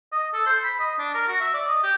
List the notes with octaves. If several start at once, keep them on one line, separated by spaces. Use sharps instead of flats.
D#5
A4
C5
B5
D#5
D4
A#4
F#4
E5
D5
D#5
G4